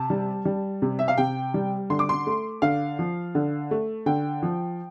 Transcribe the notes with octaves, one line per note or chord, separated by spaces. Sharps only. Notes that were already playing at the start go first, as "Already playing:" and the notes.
Already playing: C3 A5
G3
G3
C3
E5
F5
C3 G5
G3
D3 C6
D6
C6
A3
D3 F5
F3
D3
A3
D3 G5
F3